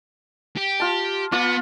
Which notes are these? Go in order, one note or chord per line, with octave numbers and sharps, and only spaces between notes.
G4
F4 A5
B3 F4 D6